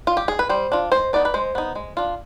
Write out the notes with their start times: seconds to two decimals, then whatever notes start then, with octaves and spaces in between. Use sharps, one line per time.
0.07 F4
0.17 G4
0.28 G#4
0.39 B4
0.49 G3 C5
0.72 D4 F4
0.92 G#3 C5
1.13 B3 D#4 D5
1.25 B4
1.34 G#3 C5
1.55 B3 D#4
1.75 G#3
1.97 D4 F4